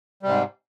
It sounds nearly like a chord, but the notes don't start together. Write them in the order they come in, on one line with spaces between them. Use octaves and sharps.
G3 C3 G#2